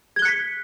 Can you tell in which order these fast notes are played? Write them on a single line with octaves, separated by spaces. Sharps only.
G#6 G7 F#6 C#7 B6